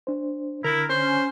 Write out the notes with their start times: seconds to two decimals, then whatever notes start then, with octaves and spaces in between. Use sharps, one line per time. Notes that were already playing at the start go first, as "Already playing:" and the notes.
0.07 D4 C5
0.64 D3 E4 A#4
0.89 C#4 C5